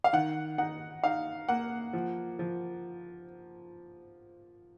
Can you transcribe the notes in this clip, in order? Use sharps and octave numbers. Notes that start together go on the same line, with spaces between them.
F5
D#3 F#5
D#4 F#5
D#4 F5
A#3 F#5
F3
F3